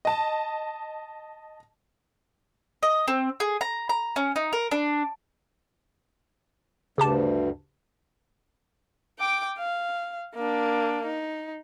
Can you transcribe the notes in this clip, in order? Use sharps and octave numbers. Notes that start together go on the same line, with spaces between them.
D#5 A5
D#5
C4
G#4
A#5
A#5
C#4
D#4
A#4
D4
D2 G2 C#3 G4 A5
G5 D6
F5
A#3 D4
D#4